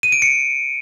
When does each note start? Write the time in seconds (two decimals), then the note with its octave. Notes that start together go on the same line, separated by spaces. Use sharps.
0.03 D#7
0.12 D7
0.22 C#7